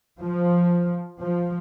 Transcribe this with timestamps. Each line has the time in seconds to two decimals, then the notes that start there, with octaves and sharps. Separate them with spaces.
0.21 F3
1.21 F3